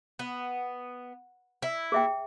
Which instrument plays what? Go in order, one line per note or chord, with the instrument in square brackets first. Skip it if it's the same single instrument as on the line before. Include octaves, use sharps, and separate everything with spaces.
[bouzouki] B3
E4
[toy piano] G#4 E5 G5